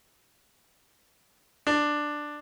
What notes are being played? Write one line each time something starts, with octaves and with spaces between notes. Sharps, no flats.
D4